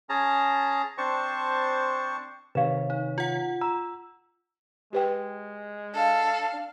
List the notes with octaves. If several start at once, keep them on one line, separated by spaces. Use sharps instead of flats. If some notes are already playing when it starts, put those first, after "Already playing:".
C#4 G#4 A5 A#5
C4 D4 C5 A5 C#6
C3 D#3 B4 C#5 F5
D#4
F4 F#5
A#5 E6
G#3 G4 B4 G5
D4 A4 F5